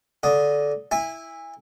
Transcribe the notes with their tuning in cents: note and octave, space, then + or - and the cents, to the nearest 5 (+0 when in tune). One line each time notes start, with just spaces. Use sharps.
D3 -15 D#5 +0
E4 +0 G#5 -30